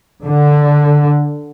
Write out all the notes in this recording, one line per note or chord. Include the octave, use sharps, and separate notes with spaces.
D3